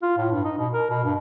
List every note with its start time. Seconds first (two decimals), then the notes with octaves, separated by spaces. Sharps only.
0.03 F4
0.18 A2
0.31 G2
0.45 D#4
0.58 B2
0.74 A#4
0.90 B2
1.04 G2